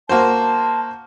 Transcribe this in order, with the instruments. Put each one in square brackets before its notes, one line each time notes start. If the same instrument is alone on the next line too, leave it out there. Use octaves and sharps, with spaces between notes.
[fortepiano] A#3 F#4 C5 [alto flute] A5